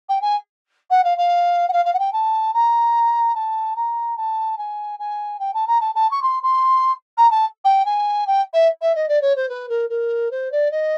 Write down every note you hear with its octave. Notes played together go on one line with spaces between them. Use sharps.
G5
G#5
F#5
F5
F5
F#5
F5
F5
F#5
G5
A5
A#5
A5
A#5
A5
G#5
G#5
G5
A5
A#5
A5
A5
C#6
C6
C6
A#5
A5
G5
G#5
G5
E5
E5
D#5
D5
C#5
C5
B4
A#4
A#4
C5
D5
D#5